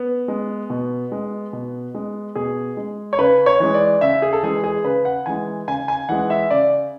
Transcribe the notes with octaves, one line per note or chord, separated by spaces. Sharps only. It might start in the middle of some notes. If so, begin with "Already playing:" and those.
Already playing: B3
G#3
B2
G#3
B2
G#3
B2 G#4
G#3
C#5
C#3 B4
C#5
E3 G#3
D5
C#3 E5
G#4
A4
E3 G#3 G#4
G#4
C#3 B4
F#5
E3 G#3 G#5
C#3 G#5
G#5
E3 G#3 F#5
E5
C#3 D5